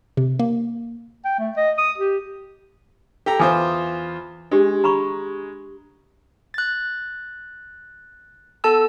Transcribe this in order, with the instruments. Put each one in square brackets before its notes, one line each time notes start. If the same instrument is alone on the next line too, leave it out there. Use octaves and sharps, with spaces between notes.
[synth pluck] C3
A#3
[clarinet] G5
A3
D#5
D#6
G4
[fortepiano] G4 A4 A#5
[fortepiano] E2 F4 C5 [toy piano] G#5 D6 D#6
[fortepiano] G#3 [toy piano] D4 G4
[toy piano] A#5 B5 C#6
[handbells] F#6 A6
B3 A4 A5 E6